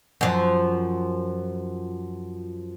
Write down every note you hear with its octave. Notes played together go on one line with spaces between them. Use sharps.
F#2 F3